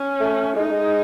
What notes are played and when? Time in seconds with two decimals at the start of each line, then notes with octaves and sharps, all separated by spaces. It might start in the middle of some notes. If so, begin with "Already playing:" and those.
Already playing: C#4
0.20 A3
0.56 G#3 D#4
0.64 A3
0.71 G#3